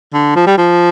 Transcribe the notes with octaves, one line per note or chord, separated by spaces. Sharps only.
D3
F3
G3
F3